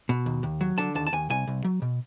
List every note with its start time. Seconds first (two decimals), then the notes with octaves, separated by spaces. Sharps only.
0.09 B2
0.26 D#2
0.43 D#2
0.61 F#3
0.78 D3 A5
0.95 D#2 A5
1.07 A5
1.13 D#2 G#5
1.30 C2 G#5
1.47 C2
1.64 F#3
1.82 B2